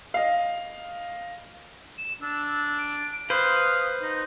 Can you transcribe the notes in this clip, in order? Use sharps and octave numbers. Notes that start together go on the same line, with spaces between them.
D#5 F5
E7
D4 E6
D7
B4 C5 F5 D#6
D#4